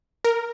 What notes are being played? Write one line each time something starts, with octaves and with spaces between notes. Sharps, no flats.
A#4